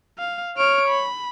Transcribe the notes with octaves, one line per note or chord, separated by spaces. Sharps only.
F5
C#5 F6 D7
B5